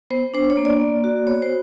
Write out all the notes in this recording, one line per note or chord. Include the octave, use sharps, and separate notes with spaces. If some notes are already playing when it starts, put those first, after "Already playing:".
B3 C5
D4 C5
C#5
A#3
D5
A#3
F#4
B3 C#5
C5